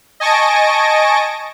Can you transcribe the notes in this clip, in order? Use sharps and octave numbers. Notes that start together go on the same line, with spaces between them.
D#5 G#5 A5 C#6 A#6 D7